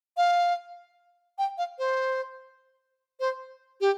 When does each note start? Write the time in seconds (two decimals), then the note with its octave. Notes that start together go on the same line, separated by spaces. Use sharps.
0.17 F5
1.38 G5
1.58 F5
1.79 C5
3.20 C5
3.81 G4